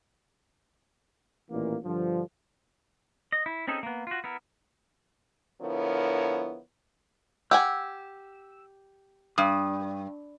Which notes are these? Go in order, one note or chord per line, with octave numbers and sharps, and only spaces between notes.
A1 A#2 D#3 E3 A#3
G2 D3 F3
D#5
E4
C4 C#4 D#4 G#4 A4
A#3 B3
F4 F#4
B3 E4 A#4
D3 F3 B3 E4 A#4 C#5
G4 F#5 G#5 E6
G2 D#6